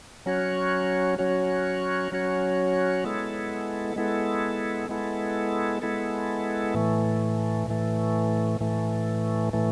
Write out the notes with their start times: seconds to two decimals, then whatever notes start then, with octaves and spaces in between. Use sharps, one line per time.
0.26 F#3 C#4 F#4 C#5
1.18 F#3 C#4 F#4 C#5
2.12 F#3 C#4 F#4 C#5
3.04 G#3 B3 E4 A4
3.96 G#3 B3 E4 A4
4.89 G#3 B3 E4 A4
5.82 G#3 B3 E4 A4
6.74 A2 E3 A3
7.68 A2 E3 A3
8.61 A2 E3 A3
9.53 A2 E3 A3